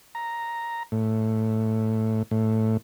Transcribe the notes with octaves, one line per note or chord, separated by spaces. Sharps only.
A#5
A2
A2